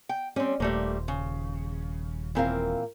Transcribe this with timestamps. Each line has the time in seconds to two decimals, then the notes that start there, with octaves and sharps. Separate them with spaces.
0.09 G5
0.36 G3 C4 C#4
0.60 D#1 G3 A3 A#3 C5
1.08 C#3
2.35 A#2 E3 C4 A#4 F5